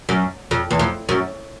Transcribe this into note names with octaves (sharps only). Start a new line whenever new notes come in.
F#2
F2
E2
F2
F#2